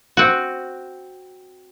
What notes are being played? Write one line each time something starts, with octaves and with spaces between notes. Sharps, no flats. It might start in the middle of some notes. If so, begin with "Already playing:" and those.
C4 F#4